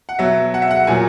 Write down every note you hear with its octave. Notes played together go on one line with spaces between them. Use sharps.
F#5
B2 F#3 E5
F#5
E5
F#5
A#2 F#3 G#5